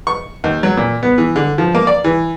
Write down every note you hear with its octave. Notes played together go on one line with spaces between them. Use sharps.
C#6
D#2
F#3
A#2
B3
E3
D3
F3
A#3
D5
E3